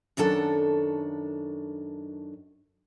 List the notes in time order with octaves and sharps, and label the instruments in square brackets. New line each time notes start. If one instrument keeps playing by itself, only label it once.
[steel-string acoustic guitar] F#2 D#3 D4 A4 F#5